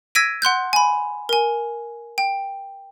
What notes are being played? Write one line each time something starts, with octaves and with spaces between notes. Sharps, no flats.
E6 G#6 A#6 B6 D7 D#7
F#5 C6 F#6 G6
G#5 B5
A#4 G#5
G5